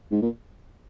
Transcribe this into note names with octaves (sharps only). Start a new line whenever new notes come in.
G#2
A#2